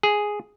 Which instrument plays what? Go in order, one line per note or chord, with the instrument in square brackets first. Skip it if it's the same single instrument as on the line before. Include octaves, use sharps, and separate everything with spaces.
[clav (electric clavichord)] G#4